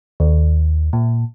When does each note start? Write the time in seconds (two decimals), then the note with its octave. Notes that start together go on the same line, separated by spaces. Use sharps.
0.20 D#2
0.93 A#2